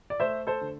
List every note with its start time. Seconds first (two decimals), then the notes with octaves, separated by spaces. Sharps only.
0.10 D5
0.19 A3 C5 E5
0.47 A4 C5
0.61 D3